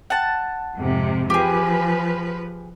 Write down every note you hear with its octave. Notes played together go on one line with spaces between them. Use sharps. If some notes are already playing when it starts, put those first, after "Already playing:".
F#5 A5
F2 G#2 C3
F3 G4 G#4 B4